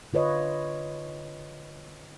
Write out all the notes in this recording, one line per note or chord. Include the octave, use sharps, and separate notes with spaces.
D3 F4 B4 C#5 D#5